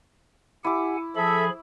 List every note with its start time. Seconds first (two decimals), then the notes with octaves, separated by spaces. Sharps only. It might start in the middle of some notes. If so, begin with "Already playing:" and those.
0.65 E4 G4 F#5 G#5 D6
1.16 F3 G#4 A4 E5 B5